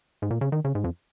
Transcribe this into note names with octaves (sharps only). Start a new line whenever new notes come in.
G#2
A#2
C#3
D#3
C#3
G#2
F2